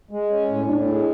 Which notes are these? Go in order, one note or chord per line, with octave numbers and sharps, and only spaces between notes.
G#3
C#4
A2
A2 D4
G#3